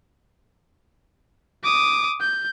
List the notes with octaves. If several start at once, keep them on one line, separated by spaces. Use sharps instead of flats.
D6 D#6
G6